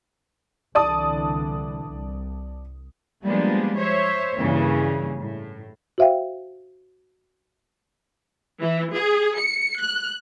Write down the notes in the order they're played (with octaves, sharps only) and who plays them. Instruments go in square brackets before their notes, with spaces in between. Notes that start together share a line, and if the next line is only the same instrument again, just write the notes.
[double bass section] C2 D3 E3 [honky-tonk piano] D5 A5 D#6
[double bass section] C2
[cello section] F3 G3 G#3 A#3 B3 D4
C5 C#5 E5
G2 C#3 E3 A#3
A2
[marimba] F#4 C5 E5 F5 G5
[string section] E3
G#4
C#7
F#6